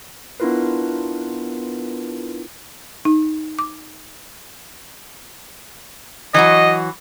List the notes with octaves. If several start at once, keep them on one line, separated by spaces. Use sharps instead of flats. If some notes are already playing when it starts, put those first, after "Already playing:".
B3 D4 E4 F4 A#4 B4
D#4
D6
E3 F#3 F#4 D#5